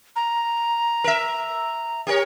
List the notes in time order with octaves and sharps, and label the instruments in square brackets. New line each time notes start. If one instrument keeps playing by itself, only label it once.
[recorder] A#5
[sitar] A#4 E5
G4 A#4 C#5